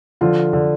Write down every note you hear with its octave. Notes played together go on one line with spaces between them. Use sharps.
D3 F3 F4
D3